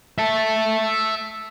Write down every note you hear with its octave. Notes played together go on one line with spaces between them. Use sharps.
E5 A5